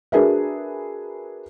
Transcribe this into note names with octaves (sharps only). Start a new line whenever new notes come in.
D4 F#4 G#4 A#4 B4 E5